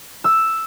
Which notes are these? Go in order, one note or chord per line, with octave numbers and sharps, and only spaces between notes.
E6